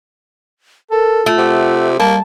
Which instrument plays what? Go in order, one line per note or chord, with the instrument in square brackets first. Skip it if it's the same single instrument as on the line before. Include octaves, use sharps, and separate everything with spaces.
[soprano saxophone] A4 [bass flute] A#4
[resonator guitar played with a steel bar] A3 [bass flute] F4
[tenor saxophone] C3 [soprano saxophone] F#5
[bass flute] G3 [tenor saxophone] A#3 [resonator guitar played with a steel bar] A5